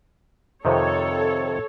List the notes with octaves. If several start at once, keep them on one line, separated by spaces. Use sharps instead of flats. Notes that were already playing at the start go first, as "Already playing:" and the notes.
F2 C3 D#3 A4 C#5